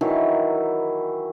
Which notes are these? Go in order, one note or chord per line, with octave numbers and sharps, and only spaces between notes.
D#3 E3 F#3 E4